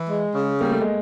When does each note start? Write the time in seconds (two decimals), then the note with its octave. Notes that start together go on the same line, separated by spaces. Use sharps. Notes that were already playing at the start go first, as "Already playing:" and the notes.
Already playing: E3
0.09 G#3
0.35 C#3
0.60 G3 A#3
0.71 A3
0.81 G#3